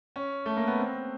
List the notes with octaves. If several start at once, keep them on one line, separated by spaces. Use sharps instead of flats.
C#4
A3
A#3
B3
C4